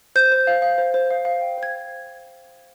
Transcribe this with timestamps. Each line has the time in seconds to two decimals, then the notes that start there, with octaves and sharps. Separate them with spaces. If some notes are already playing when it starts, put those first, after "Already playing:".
0.16 C5 G6
0.32 C5
0.47 F5
0.62 F5
0.78 C5
0.94 C5
1.11 F5
1.25 F5
1.41 G5
1.58 C5
1.63 G#6